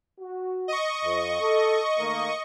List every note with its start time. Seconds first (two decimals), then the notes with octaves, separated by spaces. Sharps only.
0.20 F#4
0.68 D#5 C#6
1.04 F2
1.41 A4
1.98 D#3 A3 A#3